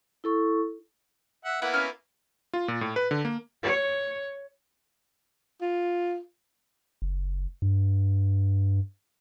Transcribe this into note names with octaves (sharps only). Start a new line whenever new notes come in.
E4 A4 C#6
E5 F#5
A#3 B3 E4 F#5
C#4 F#4 F6
F4
A#2
A2
B4
D3
A#3
C#5
F4
F#1
G2